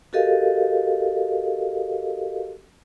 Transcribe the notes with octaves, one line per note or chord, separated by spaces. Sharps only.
F#4 G4 A4 A#4 D#5 F5